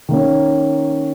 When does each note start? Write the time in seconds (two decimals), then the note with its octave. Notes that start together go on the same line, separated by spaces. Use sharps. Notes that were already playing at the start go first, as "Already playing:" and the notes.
0.09 D#3 A#3 C#4